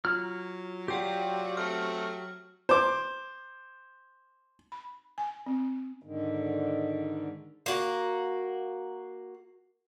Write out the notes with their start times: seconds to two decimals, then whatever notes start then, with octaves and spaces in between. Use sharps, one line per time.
0.05 F#3 F4 F6
0.88 F4 G4 D5 F#5 G5 G6
1.57 A3 C4 F6
2.69 C5 D6
4.72 B5
5.18 G#5
5.46 C4
6.02 G#2 D3 D#3
7.66 A#3 F#4